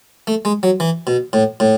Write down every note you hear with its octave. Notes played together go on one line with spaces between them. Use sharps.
A3
G#3
F#3
E3
B2
A2
A2